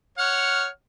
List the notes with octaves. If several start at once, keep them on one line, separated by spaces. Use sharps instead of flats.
C#5 F#5 F6